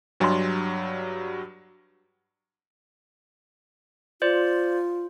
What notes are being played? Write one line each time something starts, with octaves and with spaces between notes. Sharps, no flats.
G2 F#3 G3 D4 D#5 C6
F4 C5 D5